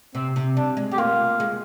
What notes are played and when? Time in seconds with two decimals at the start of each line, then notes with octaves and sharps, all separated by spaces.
0.14 C3 C4
0.36 C3
0.56 G3 D4
0.77 G#3
0.91 G#3 G4
0.98 A#3 F4
1.40 G#3